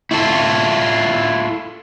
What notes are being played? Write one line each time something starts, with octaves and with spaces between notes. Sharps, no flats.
E4 F4 A4